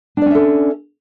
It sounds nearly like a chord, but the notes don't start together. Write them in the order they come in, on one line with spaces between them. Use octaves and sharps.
D4 D5 C#4 E5 A4